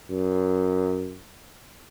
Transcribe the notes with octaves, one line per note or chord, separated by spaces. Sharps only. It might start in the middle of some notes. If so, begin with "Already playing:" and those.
F#2